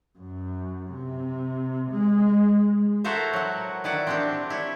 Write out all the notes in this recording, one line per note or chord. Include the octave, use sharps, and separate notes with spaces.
F#2
C3
G#3
E4 F#4 A4 A#4 C5 E5
F#3 F#5
D#3 E4 D5 F#5
C4 D4 G4
E4 C#5